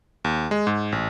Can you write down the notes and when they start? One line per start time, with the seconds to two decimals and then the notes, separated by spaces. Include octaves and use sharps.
0.24 D#2
0.51 G#3
0.67 G#2
0.92 A1